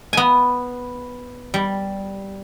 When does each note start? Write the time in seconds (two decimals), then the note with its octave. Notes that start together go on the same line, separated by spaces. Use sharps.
0.13 B3 G#5
1.54 G3